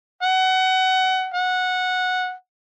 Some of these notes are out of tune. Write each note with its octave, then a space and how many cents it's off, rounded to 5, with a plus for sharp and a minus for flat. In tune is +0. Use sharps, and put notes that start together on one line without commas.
F#5 +25
F#5 -10